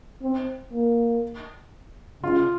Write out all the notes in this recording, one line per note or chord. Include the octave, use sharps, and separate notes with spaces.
C4
A#3
C#3 F4